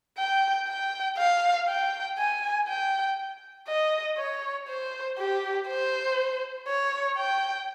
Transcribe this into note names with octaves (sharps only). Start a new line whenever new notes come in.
G5
G5
F5
G5
G#5
G5
D#5
C#5
C5
G4
C5
C#5
G5